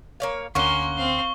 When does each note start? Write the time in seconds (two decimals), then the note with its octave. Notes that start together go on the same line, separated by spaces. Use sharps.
0.20 A#3 C#5 F5
0.55 D2 A#3 C#4 F#4 A#4 C6 C#6 G7
0.98 C4 F5